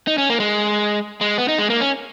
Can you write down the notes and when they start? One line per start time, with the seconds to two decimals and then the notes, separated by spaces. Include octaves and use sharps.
0.07 D#4
0.18 C#4
0.30 A#3
0.40 G#3
1.21 G#3
1.38 B3
1.48 D#4
1.59 G#3
1.70 A#3
1.81 C#4